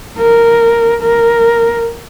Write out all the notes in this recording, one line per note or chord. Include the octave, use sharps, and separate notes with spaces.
A#4
A#4